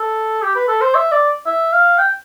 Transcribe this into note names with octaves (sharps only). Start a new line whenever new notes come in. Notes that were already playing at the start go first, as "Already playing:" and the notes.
Already playing: A4
G4
B4
A4
C5
E5
D5
E5
F5
G5